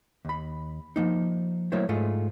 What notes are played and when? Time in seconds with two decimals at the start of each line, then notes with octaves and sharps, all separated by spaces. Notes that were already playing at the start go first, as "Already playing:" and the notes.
0.25 D#2 B5
0.96 F3 A#3 D#4
1.72 F#3 A3 A#3 E4 C5 C#5
1.89 G#2 A3 F4 G#4